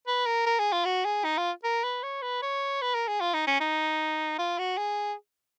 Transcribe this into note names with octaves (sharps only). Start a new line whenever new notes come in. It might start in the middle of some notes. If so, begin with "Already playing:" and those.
B4
A#4
A#4
G#4
F4
F#4
G#4
D#4
F4
A#4
B4
C#5
B4
C#5
B4
A#4
G#4
F4
D#4
C#4
D#4
F4
F#4
G#4